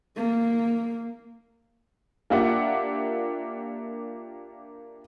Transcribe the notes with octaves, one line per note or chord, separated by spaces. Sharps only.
A#3
A#3 D4 F4 G4 E5 F#5